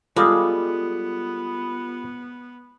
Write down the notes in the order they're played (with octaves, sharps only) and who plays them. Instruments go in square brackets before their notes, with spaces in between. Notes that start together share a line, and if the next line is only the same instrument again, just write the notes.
[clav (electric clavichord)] G3 A4 F5 [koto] G#3 [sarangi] B3 [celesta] F4